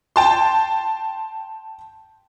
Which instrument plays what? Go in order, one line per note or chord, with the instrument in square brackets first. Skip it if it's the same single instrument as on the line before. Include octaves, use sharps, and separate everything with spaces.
[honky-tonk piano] G5 A5 C6